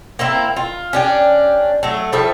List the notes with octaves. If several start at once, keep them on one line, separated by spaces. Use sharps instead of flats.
A#3 C4 E4
F4
C#4 D4 G4
F#3 A3
F3 G3 A4 E5